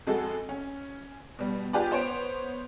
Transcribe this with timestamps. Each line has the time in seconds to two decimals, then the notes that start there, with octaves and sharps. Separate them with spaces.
0.07 F2 G#3 F#4 A4
0.49 C#4
1.39 B2 G3
1.73 F4 G4 G#4 B4 D5
1.91 B3 C5 C#5 D7